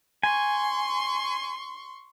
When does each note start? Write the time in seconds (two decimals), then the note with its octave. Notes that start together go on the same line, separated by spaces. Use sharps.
0.23 G#5 C6 C#6